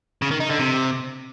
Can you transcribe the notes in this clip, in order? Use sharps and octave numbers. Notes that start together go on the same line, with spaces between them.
C#3
D#3
D#4
D3
C3